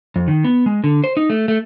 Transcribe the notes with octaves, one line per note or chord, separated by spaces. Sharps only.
F2
D#3
B3
G#3
D3
C5
D#4
A3
A3